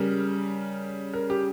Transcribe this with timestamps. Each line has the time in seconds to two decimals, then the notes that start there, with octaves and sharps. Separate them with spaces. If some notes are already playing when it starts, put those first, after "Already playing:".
Already playing: C#3 G3 A#4
1.14 A#4
1.30 G4